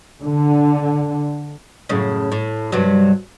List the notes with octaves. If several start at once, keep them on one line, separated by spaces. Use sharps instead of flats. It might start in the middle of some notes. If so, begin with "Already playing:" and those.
D3
F#2 A2 C#3
A2
G2 C3 F#3